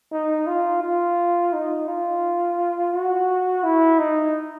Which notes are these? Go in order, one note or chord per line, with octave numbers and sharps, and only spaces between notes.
D#4
F4
F4
D#4
F4
F#4
E4
D#4